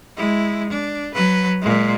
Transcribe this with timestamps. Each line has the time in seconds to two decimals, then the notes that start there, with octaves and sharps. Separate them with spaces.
0.17 G#3 E4
0.70 D4
1.14 F#3 B4
1.61 A#2 G#3